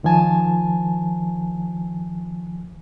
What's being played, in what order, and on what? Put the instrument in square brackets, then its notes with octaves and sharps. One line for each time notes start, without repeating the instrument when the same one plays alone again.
[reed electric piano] C#2 D#3 F3 G#5 A5